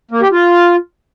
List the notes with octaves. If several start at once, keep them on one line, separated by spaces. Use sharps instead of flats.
A#3
G4
F4